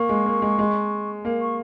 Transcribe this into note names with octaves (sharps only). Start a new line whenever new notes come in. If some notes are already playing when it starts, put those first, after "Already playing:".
Already playing: A#3 C#6
G#3
A#3
G#3
G#3
A#3
C#6